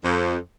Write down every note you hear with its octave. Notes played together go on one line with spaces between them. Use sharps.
F2